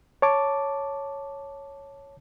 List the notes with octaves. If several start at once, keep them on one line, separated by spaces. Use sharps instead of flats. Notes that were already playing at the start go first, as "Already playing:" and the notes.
C#5 A5 D6